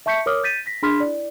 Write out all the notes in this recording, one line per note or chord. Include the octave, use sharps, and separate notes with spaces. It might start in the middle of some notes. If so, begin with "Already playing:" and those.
E5 A5 C#6 G6 B6 C#7
A#4 C#5 D6 D#6 F6
G6 A6 B6 D#7
A#6 B6
D4 G#4 B5 C6 F6 B6
E4 D5